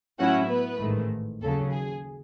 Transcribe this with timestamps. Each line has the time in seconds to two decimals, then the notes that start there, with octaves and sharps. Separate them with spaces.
0.19 A2 F#3 C#4 E4 F#4 F#5
0.49 B3 B4
0.80 A1 G#2 D#3 A3
1.41 D#2 C#3 F#3 A4
1.71 G#4